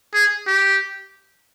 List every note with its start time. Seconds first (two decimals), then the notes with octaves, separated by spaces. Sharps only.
0.14 G#4
0.47 G4